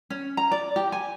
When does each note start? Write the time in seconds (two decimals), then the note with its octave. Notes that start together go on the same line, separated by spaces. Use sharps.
0.10 C#4
0.37 A#5
0.51 D5
0.76 G4
0.92 G#5